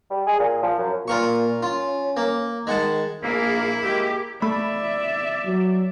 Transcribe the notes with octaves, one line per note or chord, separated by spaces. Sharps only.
G3
G#4
A#2
F3
F#2
A#2 F4 A#4 C#6
C#4 F4
A#3
D#3 G#3 F#5 A5
A#1 A#3 E4 G#4 F5
G#3 A#3 G4
A3 D5 E5 B5
F#3